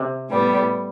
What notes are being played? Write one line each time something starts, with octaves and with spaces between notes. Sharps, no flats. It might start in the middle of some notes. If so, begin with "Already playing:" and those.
Already playing: C3
A2 G3 B3